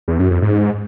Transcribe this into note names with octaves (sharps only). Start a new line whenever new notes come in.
E2
F#2
F2
G#2